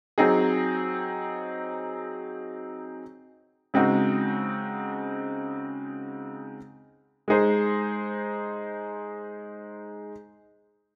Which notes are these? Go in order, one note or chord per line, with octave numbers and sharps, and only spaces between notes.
F#3 C4 D#4 G#4
C#3 G#3 C4 D#4 F#4
G#3 D#4 G#4 C5